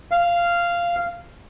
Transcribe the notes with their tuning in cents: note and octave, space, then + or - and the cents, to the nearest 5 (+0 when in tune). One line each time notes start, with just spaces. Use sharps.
F5 -10